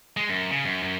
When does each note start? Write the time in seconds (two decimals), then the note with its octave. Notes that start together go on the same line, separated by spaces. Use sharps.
0.17 G#3
0.30 F#2
0.51 C#3
0.65 F#2
0.83 F#2